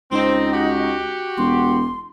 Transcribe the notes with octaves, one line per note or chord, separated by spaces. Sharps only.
C#2 C4 D#4
F#4 G4
E1 C6